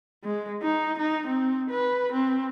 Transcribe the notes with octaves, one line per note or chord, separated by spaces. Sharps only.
G#3
D#4
D#4
C4
B4
C4